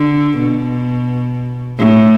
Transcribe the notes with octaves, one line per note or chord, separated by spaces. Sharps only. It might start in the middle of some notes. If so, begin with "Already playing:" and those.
Already playing: D3
B2
A2